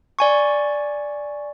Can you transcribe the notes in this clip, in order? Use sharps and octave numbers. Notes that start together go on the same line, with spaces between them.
D5 G#5 C#6